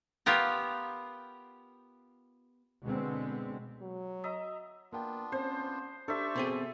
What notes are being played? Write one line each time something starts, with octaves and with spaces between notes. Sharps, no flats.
B3 F4 G4 A#4
B2 D3 G#3 B3 C4
F#3
D#5 E5 A#5
A#3 B3 D4 F4 G5
C4 C#4 C5
D4 G4 A4 C5 D5 E5 C#6
B2 C4 G#4 C6